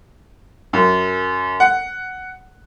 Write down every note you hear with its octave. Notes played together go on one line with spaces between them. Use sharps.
F#2
F#5